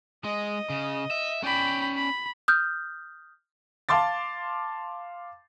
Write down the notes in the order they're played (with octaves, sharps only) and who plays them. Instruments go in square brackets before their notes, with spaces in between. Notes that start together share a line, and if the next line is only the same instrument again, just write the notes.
[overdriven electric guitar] G#3 [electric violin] D#5
[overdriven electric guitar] C#3
E5
[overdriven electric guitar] C#4 D5 [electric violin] G5 B5
[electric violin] B5
[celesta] D#6 F6 G6
[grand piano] F5 A5 C6 D6 A6